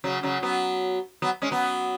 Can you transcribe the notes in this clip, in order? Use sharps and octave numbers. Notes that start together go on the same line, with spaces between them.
C#3 F#3
C#3 F#3
F#3 B3
F#3 B3
G#3 C#4
F#3 B3